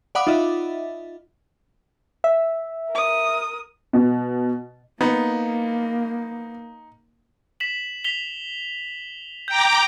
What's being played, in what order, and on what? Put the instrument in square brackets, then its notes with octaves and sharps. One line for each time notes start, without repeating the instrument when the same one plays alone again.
[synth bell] D5 F5 F#5 B5 D6 D#6
D#4 F4 D#5 E5
[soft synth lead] E5
[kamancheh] A#4 D#6
[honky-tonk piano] B2
[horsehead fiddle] A#3 [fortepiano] B3 [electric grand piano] D#4
[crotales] B6 E7 F#7
B6 F7 G7
[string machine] G5 A#5 D6 [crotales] G6 D7